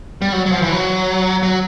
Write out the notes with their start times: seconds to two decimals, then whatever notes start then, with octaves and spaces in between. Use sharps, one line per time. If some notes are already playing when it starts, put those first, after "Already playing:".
0.22 G3
0.32 F#3
0.46 F#3
0.52 F3
0.62 E3
0.72 F#3
1.43 F#3